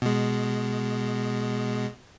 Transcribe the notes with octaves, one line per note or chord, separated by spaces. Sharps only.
B2 G#3